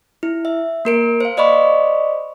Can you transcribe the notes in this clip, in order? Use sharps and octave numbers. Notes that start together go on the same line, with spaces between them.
E4
E5
A#3 A#4 D7
C5 F5
C5 D5 D#5 B5 C#6